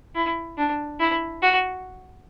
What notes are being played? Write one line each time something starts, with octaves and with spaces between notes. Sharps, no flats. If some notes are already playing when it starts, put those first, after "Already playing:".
E4
D4
E4
F#4